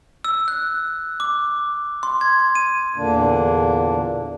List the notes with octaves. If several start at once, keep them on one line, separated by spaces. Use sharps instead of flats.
E6
F#6
D6
C6
G#6
D#7
E2 A#2 D3 A#3 D4